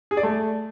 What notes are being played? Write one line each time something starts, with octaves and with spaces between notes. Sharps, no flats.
G#4
D5
A3